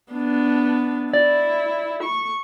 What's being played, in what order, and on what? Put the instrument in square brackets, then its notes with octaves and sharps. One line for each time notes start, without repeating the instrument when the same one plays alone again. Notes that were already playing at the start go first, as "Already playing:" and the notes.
[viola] B3 D4
[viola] E4 [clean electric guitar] D5
[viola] C#6